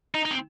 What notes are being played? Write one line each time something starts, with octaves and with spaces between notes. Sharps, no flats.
D#4
D#4
C4